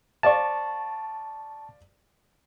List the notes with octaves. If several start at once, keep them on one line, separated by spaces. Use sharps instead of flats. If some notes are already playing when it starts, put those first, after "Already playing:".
C5 D5 F5 A5 C#6